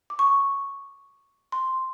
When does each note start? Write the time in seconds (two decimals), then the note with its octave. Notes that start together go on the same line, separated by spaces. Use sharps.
0.10 D6
0.19 C#6
1.52 C6